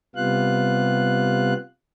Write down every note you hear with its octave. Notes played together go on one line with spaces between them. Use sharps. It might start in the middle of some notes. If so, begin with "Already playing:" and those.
C3 G3 B3 F4 F5 F#6